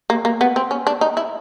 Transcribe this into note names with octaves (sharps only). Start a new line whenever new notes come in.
A#3
A#3
B3
C4
C#4
D4
D#4
E4